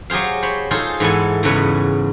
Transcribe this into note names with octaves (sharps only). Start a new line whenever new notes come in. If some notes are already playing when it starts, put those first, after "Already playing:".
F#3 G4 G#4 C5 F5
C5 C#5 B5
D#4 F4 G#4 A4 C5
G#2 E3 B3 A4 G#5
E2 G#2 C#3 B4 C#5